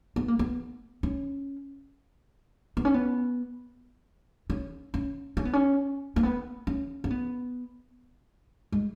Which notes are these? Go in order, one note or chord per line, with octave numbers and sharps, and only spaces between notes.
B3
A#3
B3
C#4
B3
C#4
B3
C#4
C#4
C#4
B3
C#4
A#3
B3
C#4
C#4
B3
G#3